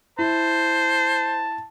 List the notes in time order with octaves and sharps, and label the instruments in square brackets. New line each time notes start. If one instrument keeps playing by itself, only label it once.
[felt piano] E4 [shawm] C5 [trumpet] A5